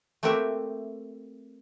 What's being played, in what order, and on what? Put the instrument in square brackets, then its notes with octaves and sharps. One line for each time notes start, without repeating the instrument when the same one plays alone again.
[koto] A3 A#3 C4 F#4 G4 E5